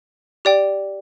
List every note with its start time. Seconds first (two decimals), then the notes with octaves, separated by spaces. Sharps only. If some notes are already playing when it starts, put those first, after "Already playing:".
0.45 G4 D5 G5